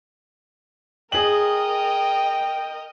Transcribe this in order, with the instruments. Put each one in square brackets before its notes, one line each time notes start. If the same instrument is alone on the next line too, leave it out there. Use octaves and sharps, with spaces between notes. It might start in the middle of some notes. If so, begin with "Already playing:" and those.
[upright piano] G#4 F#7 [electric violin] A#4 D#5 [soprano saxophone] G5